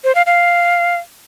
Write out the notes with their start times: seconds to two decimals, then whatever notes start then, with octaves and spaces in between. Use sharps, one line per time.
0.04 C5
0.15 F5
0.26 F5